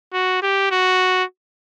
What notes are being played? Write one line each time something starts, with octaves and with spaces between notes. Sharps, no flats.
F#4
G4
F#4